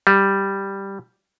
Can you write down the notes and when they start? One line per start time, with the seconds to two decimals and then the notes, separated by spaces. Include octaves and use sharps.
0.07 G3